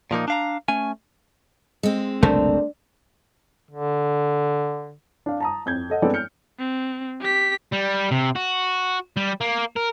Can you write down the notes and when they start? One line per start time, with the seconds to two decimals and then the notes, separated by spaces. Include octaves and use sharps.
0.11 A#2 F3 A#3 D#4
0.28 D4 F5 A#5
0.68 A3 C#4 G#5
1.83 G#3 C4
2.23 F#1 C2 B2 A3 D4 A#4 C5
3.71 D3
5.26 D4 F5
5.40 A5 A#5 D#6
5.66 F2 G6 G#6
5.90 A4 D#5 F#5
6.02 G#3 B3 C4 D4 A4 D5
6.14 F6 G6 C#7
6.59 C4
7.21 G4 B6
7.72 G3
8.11 C3
8.36 F#4
9.17 G3
9.41 A#3
9.77 A#4